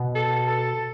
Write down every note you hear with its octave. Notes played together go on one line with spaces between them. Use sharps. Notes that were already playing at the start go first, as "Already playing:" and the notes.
Already playing: B2
A4
A4